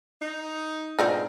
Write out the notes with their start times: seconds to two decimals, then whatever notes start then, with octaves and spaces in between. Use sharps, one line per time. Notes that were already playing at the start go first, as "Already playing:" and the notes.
0.21 D#4
0.99 G#2 B2 C4 D4 D#4 F4